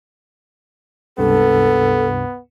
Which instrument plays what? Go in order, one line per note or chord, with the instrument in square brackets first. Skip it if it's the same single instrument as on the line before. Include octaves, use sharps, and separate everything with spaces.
[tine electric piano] C#2 G2 C3 [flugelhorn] B3 [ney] A4